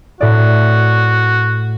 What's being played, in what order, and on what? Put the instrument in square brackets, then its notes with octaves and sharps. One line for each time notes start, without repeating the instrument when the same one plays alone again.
[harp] A2 D5 [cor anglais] F#4